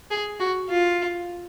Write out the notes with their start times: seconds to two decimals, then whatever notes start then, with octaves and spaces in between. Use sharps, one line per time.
0.11 G#4
0.40 F#4
0.69 F4